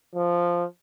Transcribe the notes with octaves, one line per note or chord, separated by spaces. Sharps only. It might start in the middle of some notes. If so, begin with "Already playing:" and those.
F3